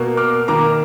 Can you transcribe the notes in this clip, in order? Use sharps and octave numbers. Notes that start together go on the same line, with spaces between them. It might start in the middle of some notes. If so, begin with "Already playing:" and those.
Already playing: B2 A#3
D6 F6
D#3 A#3 A#5 D6